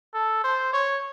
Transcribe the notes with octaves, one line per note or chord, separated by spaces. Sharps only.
A4
C5
C#5